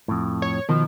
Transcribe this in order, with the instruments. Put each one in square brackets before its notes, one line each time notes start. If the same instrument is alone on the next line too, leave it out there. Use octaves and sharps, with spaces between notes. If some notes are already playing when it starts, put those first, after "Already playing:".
[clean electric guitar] F2 A2
[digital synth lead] C#5
[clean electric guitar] B2 F3 [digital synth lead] D#3